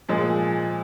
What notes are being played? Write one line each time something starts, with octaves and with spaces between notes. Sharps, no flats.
A#2 F3 G#3